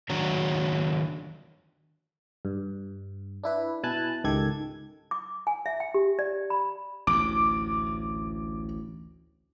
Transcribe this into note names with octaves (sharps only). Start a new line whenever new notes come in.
D#3 F#3 D4 F#4 C#5 A#5
G2
D4 E4 B4
B2 E4 G#5 A5 F#6
C#2 G#2 D#3 G4 A4 G#6
D6
G#5
E5
G5
G4
D5
B5
A1 D2 D6